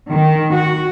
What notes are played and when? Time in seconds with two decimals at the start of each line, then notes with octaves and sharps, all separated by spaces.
0.10 D#3
0.53 F#4